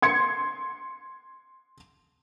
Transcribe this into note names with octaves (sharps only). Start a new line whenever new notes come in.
C6 G#6 C#7